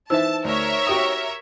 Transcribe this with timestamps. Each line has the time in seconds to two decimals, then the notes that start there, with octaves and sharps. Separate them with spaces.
0.10 E3 D#4 C5 E5 A5 E6
0.44 D2 A#4 C#5 E5
0.87 F#4 G4 D#6